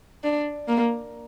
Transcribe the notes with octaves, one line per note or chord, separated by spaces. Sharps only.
D4
A#3